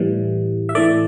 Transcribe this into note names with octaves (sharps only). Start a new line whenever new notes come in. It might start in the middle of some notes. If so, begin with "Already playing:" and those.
Already playing: A2 E3 G3
E5
A2 E3 A3 D5